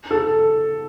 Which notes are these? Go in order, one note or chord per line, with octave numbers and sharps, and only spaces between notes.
A4